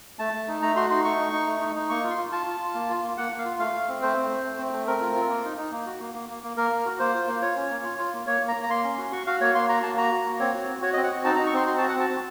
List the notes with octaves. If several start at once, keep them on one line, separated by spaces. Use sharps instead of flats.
A3 A5
A3
D#4
A3 A#5
F#4 C6
D#4 C6
A3 C#6
D#4
D#4
A3
D#4
D#4
A#3 C#6
F4
C6
F4
F4 A5
F4
F4
A#3
F4
A#3
A#3 F#5
A#3
F5
F4
A3 F5
A3
C4
A3 C5
C4
A3
A3
C4
A3
C4 A#4
F4
F4
A#3
D#4
D#4
A#3
F#4
A#3
A#3
A#3
A#3
A#3 A#4
A#3
F#4
A#3 C5
F4
A#3
F4 C#5
C#4
A#3
F4
F4
A#3
A#3 C#5
A#3
A#5
A#3
A#5
A#3 C6
C#4
F#4
F#4 C#6
F#4 F5
A#3 C#5
A#3 C6
F#4 A#5
A#3 A5
F#4 A#5
F#4
A#3
C4 C#5
F#4
F#4
F#4 C#5
D#5
C4
F#5
F#4
D#4 A5
A#5
D#4
C#6
C4 C6
F#4 C6
A5
F#4
F#5
C4 A5
C4